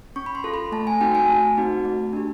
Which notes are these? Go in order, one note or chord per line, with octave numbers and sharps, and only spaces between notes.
C#4 C#6
B5
C6
F4 A4
B5
A3 A5
G#5
C4 D#4 F#4 G5
G#5
A3 A5
C4 D#4 F#4
A3
D4 G4